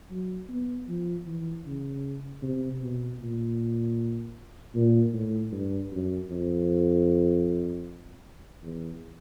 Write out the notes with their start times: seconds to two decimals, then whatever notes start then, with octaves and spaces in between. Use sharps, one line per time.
0.11 F#3
0.49 B3
0.89 F3
1.27 E3
1.66 C#3
2.42 C3
2.82 B2
3.20 A#2
4.75 A#2
5.14 A2
5.53 G2
5.92 F#2
6.31 F2
8.63 E2